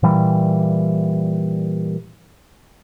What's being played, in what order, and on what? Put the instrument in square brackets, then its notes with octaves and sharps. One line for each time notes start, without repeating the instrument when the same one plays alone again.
[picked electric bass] A#2 E3 G3